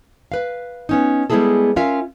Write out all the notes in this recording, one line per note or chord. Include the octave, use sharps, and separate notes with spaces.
B4 F5
B3 C#4 D#4
G3 G#3 B3 E4 G#4 A4
C#4 F4 A#4 E5 F5